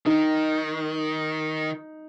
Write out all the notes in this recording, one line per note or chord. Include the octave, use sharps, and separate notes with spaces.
D#3 D#4